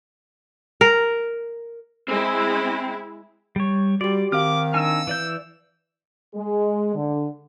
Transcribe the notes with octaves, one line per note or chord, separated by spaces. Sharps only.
A#4
G#3 C4 E4
G3 C#5
G3 F#4 G4 D5
D#3 C4 F5 D6 F6
D4 D#4 G#5 E6
E3 D5 G6
G#3
D3